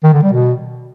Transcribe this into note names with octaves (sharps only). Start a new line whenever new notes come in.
D#3
D3
G3
B2